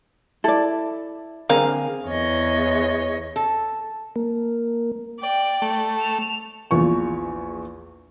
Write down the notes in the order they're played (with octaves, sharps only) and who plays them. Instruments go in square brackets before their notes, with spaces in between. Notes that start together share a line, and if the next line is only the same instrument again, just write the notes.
[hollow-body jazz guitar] E4 [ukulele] A4 D5
[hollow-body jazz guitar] D3 C4 G#4 [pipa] A#3 F5
[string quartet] E2 C#5 D#5
[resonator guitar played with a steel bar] A4
[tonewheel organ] A#3
[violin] D5 G5
[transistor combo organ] A3
[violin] E7 F7
[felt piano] A#1 E2 F4 C#6